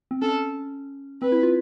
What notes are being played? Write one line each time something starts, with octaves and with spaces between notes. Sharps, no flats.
C4
C#4 A4
C4 B4
E4
F4